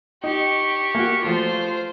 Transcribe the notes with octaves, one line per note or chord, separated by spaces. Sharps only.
D#4 G4 C#6
A#3 F#4
F3 A3 F4 C5